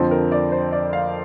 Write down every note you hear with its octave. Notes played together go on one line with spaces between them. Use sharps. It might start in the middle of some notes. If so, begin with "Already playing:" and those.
Already playing: F2 D3 F3 C4
A#4
D5
C5
D5
F5